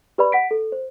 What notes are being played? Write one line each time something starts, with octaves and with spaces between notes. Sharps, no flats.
G4 B4 D5 B5
F#5 B6 D7
A4
C5